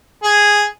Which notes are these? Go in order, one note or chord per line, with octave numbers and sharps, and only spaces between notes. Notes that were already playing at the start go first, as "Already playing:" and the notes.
G#4